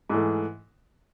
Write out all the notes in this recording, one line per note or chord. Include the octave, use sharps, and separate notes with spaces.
G#2 E3 A3